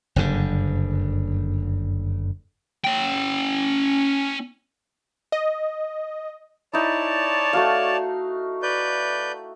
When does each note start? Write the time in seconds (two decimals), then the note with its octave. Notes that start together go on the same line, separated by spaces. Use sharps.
0.16 F#1 G2 D3
2.85 C#4 G5
5.32 D#5
6.74 D#4 E4 C#5 D5 A5
7.53 A3 F#4 F5
8.63 B4 D5 G6